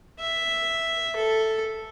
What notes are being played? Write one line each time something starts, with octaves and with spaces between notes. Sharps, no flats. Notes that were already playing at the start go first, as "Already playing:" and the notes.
E5
A4